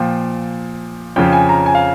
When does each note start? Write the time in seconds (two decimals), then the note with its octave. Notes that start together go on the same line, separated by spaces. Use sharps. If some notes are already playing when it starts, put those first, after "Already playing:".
Already playing: A#2 F3 G5
1.16 F2 C#3 F3 G5
1.33 G#5
1.49 A#5
1.66 G#5
1.75 F5